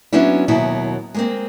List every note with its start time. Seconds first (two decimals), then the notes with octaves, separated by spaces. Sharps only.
0.13 F#3 B3 C#4 D4 E4
0.48 D#2 B2 F#3 E4
1.14 G#3 A#3 C4